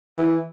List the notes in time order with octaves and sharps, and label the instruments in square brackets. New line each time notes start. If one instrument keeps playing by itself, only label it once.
[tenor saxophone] E3